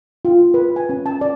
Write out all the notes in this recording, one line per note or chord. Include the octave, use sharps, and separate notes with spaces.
F4
B4
G#5
C#4
A5
D5